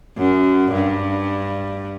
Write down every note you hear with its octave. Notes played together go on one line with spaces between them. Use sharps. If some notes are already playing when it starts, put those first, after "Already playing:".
F#2
G2